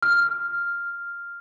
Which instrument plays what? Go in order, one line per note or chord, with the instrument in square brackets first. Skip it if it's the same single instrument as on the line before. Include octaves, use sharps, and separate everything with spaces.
[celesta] F6